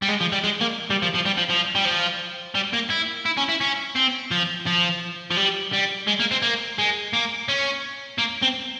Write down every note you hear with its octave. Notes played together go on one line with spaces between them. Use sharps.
G3
G#3
F3
G3
G#3
A#3
G3
F3
F3
G3
F3
F3
G3
F3
G3
A#3
E4
E4
C#4
E4
C#4
C4
F3
F3
F3
G3
G3
G#3
A#3
C4
A#3
G#3
A#3
C#4
A#3
C4